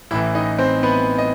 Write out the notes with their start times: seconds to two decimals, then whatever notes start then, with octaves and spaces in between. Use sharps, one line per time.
0.11 A1 A2 E3 E4 E5
0.35 D#4 D#5
0.59 C4 C5
0.83 B3 B4
1.18 D#5